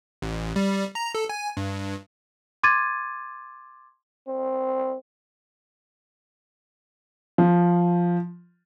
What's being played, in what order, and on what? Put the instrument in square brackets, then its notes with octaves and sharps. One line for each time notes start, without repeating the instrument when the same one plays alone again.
[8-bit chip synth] A1
G3
A#5
A4
G#5
G2
[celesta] C6 D6 G#6 A6 D#7
[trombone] C4
[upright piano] F3